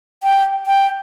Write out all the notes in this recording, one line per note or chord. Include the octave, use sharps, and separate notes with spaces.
G5
G5